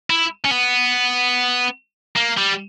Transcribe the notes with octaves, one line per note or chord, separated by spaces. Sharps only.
E4
C#4
B3
A#3
G3